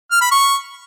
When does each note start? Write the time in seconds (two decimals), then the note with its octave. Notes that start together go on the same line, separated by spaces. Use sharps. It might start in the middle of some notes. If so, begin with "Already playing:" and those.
0.12 F6
0.22 B5
0.32 C#6